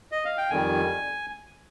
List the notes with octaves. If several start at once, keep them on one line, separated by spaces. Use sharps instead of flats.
D#5
F5
G5
F2 D#3 G3 G#5